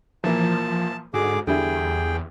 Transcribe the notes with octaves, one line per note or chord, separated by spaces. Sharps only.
A#2 E3 F3 A#3 A5
G#2 D3 F#4 G#4 D6
E2 D3 G3 E4 G#4 G5